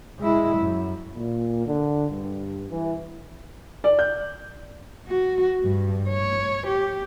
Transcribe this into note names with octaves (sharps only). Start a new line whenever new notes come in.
G#3 E4
F#2
A#2
D3
G2
E3
D5
G6
F#4
G2
C#5
G4